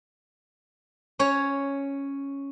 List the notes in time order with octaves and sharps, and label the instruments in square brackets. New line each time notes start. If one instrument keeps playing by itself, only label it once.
[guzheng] C#4 C#5